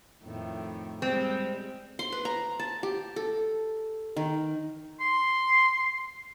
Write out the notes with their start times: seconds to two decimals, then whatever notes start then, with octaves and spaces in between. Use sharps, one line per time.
0.23 F2 A2 D#3
1.02 G3 G#3 C4
1.99 C6
2.12 B4
2.25 A#5
2.59 A5
2.83 G4
3.16 A4
4.16 D#3
5.00 C6